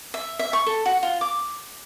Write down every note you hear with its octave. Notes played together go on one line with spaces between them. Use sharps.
E5
E5
C#6
A4
F#4
F4
D6